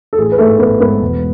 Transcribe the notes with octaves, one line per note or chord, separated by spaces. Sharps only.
A4
A1 G#4
B4
G#2 G#3 A3 A4
A1 B3 B4
G#2 G#3 B3 B4
E1